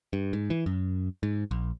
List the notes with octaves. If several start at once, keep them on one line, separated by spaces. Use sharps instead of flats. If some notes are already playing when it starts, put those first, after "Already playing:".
G2
G#2
E3
F#2
G#2
A#1